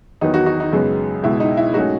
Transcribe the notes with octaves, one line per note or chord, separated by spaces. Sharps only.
E2 D#3 F#3 B3 D#4
D#4 F#4
D#4 F#4
D#4
F#2 C#3 G#3 B3
C#2 B2 G#3 E4
D#4
E4
G#2 F#3 A3 C#4 D#4 F#4